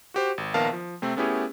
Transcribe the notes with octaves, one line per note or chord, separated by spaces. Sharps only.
F#4 G4 C5
G#1
A#1 D#3 B3 A#4 F5 A5
F3
C3 A3 C4
A3 B3 C#4 E4 G4 G#4